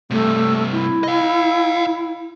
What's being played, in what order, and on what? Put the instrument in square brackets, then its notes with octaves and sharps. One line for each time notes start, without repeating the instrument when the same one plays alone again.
[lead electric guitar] G2 C3 [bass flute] A3
[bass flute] E4
[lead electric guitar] D#5 F5